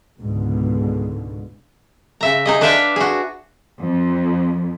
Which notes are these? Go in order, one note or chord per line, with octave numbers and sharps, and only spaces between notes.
C#2 G#2 B2 D3
C#3 E5 A#5
D#4 G#4 D#5
D4 B4 D5 E5 F5 G5
F#4 G#4
F2